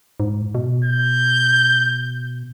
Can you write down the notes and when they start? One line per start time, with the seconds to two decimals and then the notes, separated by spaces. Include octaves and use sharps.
0.20 G#2
0.55 B2
0.85 G6